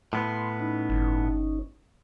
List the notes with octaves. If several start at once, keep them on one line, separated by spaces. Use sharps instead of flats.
A2 B3 C6
C#4 D#4
G1